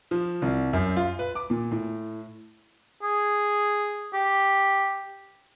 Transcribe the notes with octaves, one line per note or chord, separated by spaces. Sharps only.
F3
C2
F#2
F4
B4
D6
A#2
A2
G#4
G4